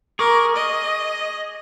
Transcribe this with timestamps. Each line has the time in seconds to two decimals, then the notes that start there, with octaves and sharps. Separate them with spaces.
0.19 G#4 A#4 C#6 D6
0.56 D#5